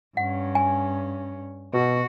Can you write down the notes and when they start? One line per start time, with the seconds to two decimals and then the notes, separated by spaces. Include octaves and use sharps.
0.17 G2 C#4 F#5
0.55 G#5
1.74 B2 F#4